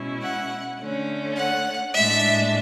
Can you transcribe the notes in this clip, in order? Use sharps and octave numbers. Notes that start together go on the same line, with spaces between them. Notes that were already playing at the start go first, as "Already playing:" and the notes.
Already playing: B2 G#3 C#4 E4
F#5
D3 A3 C#4
F#5
A2 G#3 D4 E5